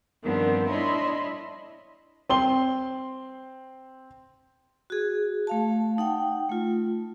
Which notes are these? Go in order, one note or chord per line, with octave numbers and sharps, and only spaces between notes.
G2 D#3 F3 B3 C4 D4
D4 E4 C#5 D#5 B5 C6
C4 C6 G7
F#4 G#4
A3 F5 A5
D#4 F#5 G5
A3 F4